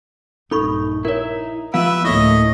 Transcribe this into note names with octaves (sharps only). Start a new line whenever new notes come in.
A#1 G2 D#4 A4 B5 C#6
D#4 E4 A#4 C#5 E5
F3 B3 G4 B4 E5 F5
D2 A2 A#3 E4 C#5 D#5